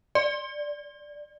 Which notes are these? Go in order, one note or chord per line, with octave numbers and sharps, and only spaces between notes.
D5